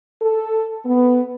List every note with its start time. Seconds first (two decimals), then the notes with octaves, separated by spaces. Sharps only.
0.21 A4
0.86 B3